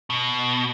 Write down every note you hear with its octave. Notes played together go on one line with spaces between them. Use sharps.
B2